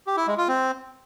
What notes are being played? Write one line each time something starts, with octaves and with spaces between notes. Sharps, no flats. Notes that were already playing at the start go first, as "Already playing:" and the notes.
G4
E4
G#3
F4
C4